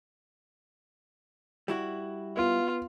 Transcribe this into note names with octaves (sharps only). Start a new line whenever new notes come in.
G3 E4 F#4
B3 F4